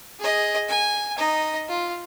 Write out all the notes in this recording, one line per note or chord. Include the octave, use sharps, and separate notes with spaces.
G#4 D#5
G#5
D#4 D#5
F4